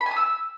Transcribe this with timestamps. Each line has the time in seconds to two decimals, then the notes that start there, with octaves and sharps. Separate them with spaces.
0.01 B5
0.06 G#5
0.11 D#6
0.16 E6